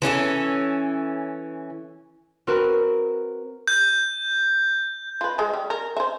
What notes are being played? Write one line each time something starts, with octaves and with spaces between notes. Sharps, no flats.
E3 C#4 D#4 A4
C4 F#4 A#4 B4
G6
F4 B4
G#3 A4
G3
A#4
C5 E5